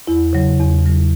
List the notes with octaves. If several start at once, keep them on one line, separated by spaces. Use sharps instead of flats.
E2 E4
C#3 F#3
E2
C#3 F#3